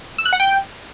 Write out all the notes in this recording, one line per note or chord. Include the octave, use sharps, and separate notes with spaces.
E6
F#6
F#5
G5